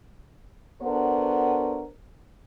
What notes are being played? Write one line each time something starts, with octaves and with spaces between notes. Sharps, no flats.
B3 D4 F#4 A4 A#4 C5